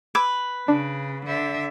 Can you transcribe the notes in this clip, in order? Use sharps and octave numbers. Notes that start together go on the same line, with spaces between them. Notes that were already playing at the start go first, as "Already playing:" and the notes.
B4 D6 E6 G#6
C#3 D4
D3 E5